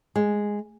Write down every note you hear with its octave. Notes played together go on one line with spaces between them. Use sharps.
G#3